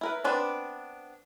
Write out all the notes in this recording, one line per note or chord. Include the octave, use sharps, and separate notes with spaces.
E4 A#4 B4
B3 C4 D4 B4 D5